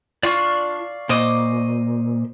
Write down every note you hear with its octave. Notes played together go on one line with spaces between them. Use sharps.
D4 F4 D5 F5 C#6
A#2 C5 D#5 D6